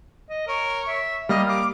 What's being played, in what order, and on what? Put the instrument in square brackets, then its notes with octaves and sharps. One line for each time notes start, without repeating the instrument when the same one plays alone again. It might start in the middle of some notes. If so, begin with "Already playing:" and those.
[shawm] D#5
[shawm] A#4 [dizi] C#5
[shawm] E5
[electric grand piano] G3 A#3 [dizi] D#5 [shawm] F5
[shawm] F5 [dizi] D6